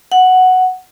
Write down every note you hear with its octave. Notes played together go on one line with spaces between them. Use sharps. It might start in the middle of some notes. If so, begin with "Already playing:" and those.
F#5